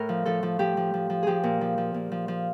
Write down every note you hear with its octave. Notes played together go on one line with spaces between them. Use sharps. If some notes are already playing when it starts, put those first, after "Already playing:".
Already playing: A2 A#4
F3
F3 A4
F3
F3 G4
F3
F3
F3
F3 G4 G#4
A#2
F3
F3
A#2
F3
F3